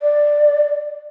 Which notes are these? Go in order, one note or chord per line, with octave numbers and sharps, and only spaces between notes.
D5